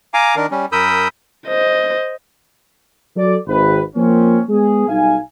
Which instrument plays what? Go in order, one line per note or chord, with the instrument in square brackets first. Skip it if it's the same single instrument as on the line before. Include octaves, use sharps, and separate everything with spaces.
[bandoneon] F5 G#5 A#5 D6
D#3 D4 A#4
G3 C#4
F#2 A#4 B5 D#6 E6 G6
[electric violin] C5 D#5
[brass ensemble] F#3 A4 D5
G#1 B4
F3 A#3 C4 C#4
G#3 B3 G#4
B1 G3 D#4 F5 G#5